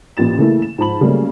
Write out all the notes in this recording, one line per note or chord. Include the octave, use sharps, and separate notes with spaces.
A1 A#2 A6 E7
C#3 E3 A3 A#3 E4
E7
G#2 F3 C5 A5 B5 F#7
C#3 F#3 G3 A3 A#3 C#4